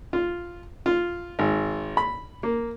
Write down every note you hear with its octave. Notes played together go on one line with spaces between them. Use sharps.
F4
F4
G#1
B5
A#3